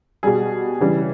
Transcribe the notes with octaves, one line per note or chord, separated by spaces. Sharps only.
B2 G3 G#4
C#3 E3 G3